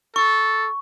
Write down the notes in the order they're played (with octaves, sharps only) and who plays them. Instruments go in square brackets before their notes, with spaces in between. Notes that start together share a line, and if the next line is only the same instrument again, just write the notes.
[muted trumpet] A4 [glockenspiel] C#6